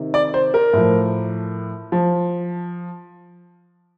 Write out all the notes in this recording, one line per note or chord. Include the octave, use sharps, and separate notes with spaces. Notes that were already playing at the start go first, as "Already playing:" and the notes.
Already playing: C3 D#3
D5
C5
A#4
A2 F3
F3